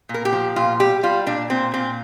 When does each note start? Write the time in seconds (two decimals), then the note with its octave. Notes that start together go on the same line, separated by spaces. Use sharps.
0.09 A#2
0.14 A#4
0.25 G4
0.33 F3
0.56 A#2 F4
0.80 G3 G4
1.03 G3 F4
1.26 A#2 D4
1.50 A#2 C4
1.74 A#2 C4